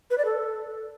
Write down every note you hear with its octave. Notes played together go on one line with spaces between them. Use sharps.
B4
D5
A4